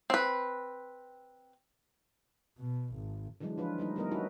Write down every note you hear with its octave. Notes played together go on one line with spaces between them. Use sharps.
C4 B4
B2
G#1
D3 E3 F#3 G#3 D4
F3 F4 B4
G3 A3 D#4
G3 A3 B3 A#4 D#5
C#4 D#4 E4 F#4 B4